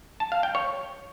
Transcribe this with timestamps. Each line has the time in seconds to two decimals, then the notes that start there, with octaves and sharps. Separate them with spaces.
0.20 A5
0.32 F5
0.43 G5
0.55 C#5